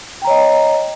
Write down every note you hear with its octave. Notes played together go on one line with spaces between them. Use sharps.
C#5 D#5 G5 A#5